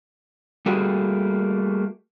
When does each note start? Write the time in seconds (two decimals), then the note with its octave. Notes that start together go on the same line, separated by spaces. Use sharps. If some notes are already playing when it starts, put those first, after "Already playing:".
0.66 G3 A3 A#3 F#4 G#4